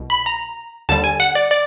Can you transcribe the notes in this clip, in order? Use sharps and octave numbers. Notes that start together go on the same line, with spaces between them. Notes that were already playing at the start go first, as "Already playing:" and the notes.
Already playing: C2 B2
B5
A#5
D#2 D3 G3 A5
G#5
F#5
D5
D5